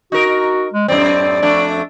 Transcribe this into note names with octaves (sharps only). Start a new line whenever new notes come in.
D#4 F#4 A#4
G#3
F#2 A2 C4 D5
F2 A3 D4